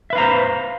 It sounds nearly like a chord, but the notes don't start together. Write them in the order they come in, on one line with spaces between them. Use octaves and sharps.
E5 B4 F5 A#5 C5